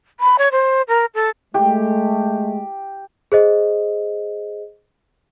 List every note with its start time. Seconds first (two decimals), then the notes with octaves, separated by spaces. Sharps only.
0.20 B5
0.38 C#5
0.52 C5
0.88 A#4
1.15 A4
1.54 G#3 A3 G4
3.32 G#4 C5 D#5